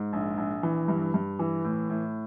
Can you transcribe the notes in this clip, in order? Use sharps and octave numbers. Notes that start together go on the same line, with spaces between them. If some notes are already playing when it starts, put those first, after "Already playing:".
Already playing: G#2
A#1
A#1
E3
G2
G2
E3
A2
A2